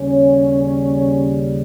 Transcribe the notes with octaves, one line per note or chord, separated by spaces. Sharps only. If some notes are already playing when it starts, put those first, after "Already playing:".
Already playing: D#2 C#3 G3 C#4